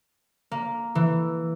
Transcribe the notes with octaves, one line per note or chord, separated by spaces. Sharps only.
A#3
E3